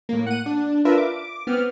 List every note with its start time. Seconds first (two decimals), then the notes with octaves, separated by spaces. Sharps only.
0.09 A2 A#3
0.26 F#5 D#7
0.46 D4
0.85 D4 F4 A#4 B4 E5
0.98 D6
1.47 B3 C4 F6